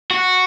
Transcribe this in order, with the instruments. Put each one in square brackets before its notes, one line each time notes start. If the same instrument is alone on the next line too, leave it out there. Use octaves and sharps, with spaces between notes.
[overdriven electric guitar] F#4